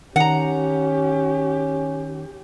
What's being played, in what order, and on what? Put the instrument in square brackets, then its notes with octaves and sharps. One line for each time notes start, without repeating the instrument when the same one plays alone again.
[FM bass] D#3 [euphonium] C#4 [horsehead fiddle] G4 [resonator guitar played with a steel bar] F#5 A#5